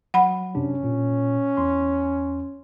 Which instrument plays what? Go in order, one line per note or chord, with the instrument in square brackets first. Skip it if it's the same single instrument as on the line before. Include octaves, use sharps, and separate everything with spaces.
[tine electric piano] F#3 [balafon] F#5 B5
[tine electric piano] F#2 C3 D4 [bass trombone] C#4
[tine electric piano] A#2
E2 C6